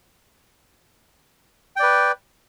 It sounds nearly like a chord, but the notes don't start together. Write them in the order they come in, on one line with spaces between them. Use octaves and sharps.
G5 D5 B4